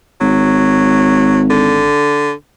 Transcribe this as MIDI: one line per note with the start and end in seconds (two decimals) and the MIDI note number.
0.21 1.91 32
0.21 1.41 54
1.50 2.32 50